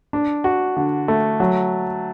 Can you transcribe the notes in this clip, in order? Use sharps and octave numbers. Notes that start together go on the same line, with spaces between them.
D4
F#4
D3
A3
F#3